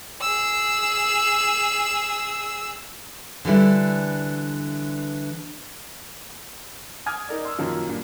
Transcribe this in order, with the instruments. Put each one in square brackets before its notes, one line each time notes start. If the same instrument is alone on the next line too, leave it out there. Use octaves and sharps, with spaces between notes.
[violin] G#4 E6
[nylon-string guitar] D3 E3 G3 E4
[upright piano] G#5 D6 D#6 F6 G#6
D#4 A#4 D5
C6 E6
F#2 A#2 D#3 F3 A#3
G2 A#2